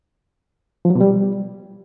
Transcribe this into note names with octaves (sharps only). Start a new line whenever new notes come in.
F3
F#3
B2
G3